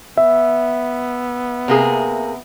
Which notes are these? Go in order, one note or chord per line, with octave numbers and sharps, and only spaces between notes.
B3 E5
C3 A#3 G#4